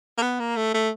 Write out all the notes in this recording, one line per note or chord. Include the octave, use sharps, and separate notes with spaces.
A#3
B3
A#3
A3
A3